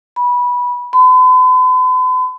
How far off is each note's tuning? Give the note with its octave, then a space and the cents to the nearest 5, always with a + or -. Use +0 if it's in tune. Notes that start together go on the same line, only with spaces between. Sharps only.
B5 -15
B5 +45